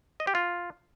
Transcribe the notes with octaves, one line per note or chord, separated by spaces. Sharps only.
D#5
G4
F4